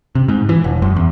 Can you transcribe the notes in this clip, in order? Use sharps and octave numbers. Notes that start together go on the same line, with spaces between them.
C3
G#2
E3
E1
F#2
E2